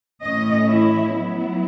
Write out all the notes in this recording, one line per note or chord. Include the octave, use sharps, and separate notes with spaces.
A2 E3 A3 C#4 D#5
E4
F#3 B3 E4